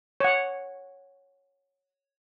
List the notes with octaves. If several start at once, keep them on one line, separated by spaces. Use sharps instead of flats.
C#5 F#5